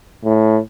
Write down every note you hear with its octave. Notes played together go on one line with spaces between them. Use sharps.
A2